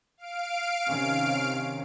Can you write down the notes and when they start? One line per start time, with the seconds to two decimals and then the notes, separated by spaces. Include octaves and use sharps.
0.17 F5 D7
0.88 C3 D#3 C#4